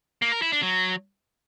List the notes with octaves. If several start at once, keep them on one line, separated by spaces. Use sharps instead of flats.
A#3
A#4
E4
D4
F#3